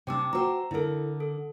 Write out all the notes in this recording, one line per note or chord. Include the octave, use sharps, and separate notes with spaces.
C3 D4 G5 D6 E6
F#4 C5 G5 A#5 E6
D3 E4 A4 A#4
A4